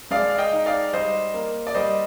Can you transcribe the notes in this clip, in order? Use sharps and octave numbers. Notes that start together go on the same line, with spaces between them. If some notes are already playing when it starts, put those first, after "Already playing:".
G#3 D5 F5
F5
D#5 G5
D#4
D5 F5
G3 C5 D#5
A#3
D5
G3 C5 D#5